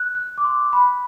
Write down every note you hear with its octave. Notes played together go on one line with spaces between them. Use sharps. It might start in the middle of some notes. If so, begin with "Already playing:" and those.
Already playing: F#6
F#6
D6
C6
B5